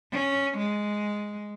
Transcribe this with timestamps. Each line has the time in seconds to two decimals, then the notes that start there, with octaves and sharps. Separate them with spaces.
0.13 C#4
0.58 G#3